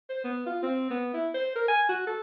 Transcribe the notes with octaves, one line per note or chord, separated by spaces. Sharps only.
C5
B3
F4
C4
B3
E4
C5
A#4
G#5
F#4
A4